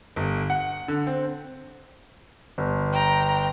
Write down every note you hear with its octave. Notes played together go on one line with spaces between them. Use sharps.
G1
F#5
D3
C4
G1
G5 A#5